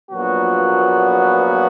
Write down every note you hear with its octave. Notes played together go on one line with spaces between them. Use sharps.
A#1 A#2 F#3 B3 F#4